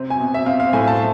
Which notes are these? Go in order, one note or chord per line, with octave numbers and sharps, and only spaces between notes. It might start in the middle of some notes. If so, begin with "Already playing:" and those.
Already playing: C3 C4
G#5
B2
E5
C4 F5
F5
A2 G#5
A5